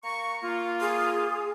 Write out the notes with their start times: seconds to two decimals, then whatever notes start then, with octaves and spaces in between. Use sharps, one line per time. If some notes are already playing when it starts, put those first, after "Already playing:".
0.04 A#3 A#5 C#6
0.42 A#3 F4
0.81 G#4